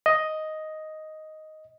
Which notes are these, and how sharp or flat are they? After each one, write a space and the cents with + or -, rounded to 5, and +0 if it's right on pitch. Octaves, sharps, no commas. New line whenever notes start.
D#5 +5